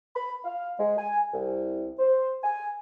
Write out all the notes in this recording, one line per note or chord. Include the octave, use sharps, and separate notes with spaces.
B5
F5
G#3
G#5
C2
C5
G#5